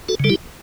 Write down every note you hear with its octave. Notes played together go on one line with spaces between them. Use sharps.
F#4 A4
C#3 G3 A4
E4 G4